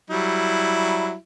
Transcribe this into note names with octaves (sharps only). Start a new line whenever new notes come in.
F#3 G3 E4